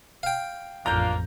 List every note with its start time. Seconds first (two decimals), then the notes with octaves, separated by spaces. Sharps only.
0.23 F5 G5
0.86 A1 F2 A#3 D4 F4 A#5 G6